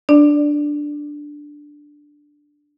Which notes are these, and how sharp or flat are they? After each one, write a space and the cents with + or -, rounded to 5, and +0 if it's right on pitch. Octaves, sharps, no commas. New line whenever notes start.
D4 +0 D5 +0